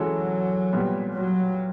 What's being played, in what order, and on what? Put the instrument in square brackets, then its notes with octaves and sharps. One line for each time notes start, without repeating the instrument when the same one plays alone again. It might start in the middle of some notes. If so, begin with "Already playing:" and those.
Already playing: [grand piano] E3 G#3 C#4 F#4 A4 [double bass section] F#3
[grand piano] A#2 G3 B3
[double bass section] F#3